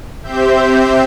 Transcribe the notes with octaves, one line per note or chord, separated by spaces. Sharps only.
C4 G4 C5 E5 G6